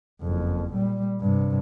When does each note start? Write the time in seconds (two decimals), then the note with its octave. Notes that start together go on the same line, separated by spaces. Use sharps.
0.21 F#1 F2
0.73 A#2 G3
1.21 G2 C3